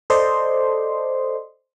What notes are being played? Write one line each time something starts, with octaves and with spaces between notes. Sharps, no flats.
A4 C5 D5 D#5 C6